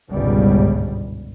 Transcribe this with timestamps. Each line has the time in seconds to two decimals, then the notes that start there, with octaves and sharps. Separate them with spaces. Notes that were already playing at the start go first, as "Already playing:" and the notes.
0.11 G1 C#2 G#2 B2 G3